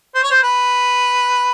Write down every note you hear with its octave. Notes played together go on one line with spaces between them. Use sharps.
C5
C#5
C5
B4